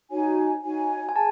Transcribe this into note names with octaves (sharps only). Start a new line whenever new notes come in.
D#4 F#4 C#5 G#5
D#4 F#4 C#5 G#5
G#5
G#4 A5